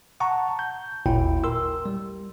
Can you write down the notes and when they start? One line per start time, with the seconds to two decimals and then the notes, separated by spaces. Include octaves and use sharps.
0.20 F#5 A5 A#5 C#6
0.59 G6
1.06 G#1 D#2 A#2 E4 G5
1.44 A#4 C6 E6
1.86 G3